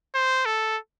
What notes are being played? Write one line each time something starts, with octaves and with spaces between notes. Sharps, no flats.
C5
A4